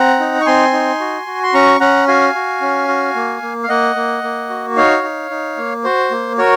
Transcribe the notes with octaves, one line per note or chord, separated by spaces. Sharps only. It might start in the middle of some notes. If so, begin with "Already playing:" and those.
Already playing: C4 F#5 A#5
D#4
C#6
C4 G#5 C6
D#4
F#4
F#4
C6
C#4 A#5 C#6
C#4 F#5 A#5
F#4 F5 G#5
F#4
C#4
F#4
A#3
A#3
F5
A#3 D#5 F#5
A#3
A#3
F#4
D#4 C#5 F5
D#4
D#4
A#3
F#4 C5
A#3
F#4 A#4 C#5